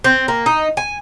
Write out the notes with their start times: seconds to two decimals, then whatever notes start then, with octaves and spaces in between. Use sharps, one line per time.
0.04 C4
0.28 A#3
0.46 D#4
0.77 G#5